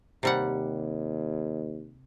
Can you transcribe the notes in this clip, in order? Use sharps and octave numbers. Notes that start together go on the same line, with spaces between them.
D#2 C3 G3 F#5